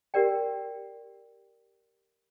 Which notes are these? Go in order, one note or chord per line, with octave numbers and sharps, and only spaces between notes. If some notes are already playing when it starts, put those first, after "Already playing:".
G4 A#4 D5 G5